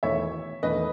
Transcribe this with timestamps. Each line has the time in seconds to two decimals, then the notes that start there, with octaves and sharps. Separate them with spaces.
0.03 E1 E2 D#3 A3 C#5 E5
0.63 E1 E2 D#3 A3 B4 D#5